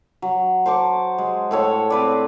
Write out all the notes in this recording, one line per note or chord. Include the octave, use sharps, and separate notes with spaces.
F#3
C5 A5 C#6 D6
G#3
A2 A4 C#5
C4 B4 D5